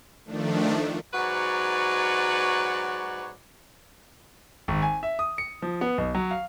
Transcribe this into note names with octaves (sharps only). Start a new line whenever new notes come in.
D#3 F3 A3 D4
G#2 F#3 F#4 B4 C#5 D5
G#1
G#5
E5
D#6
C#7
F3
B3
B1
F#3
F5